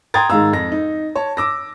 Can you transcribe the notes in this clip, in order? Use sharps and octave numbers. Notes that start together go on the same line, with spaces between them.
G5 A#5 C6 D#6 G#6 A6
G#2 D#3 G#3 F5 A#5 E6
F2 A#6
D#4
C#5 A5
D6 E6 A#6